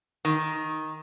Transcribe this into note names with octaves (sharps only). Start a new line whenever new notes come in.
D#3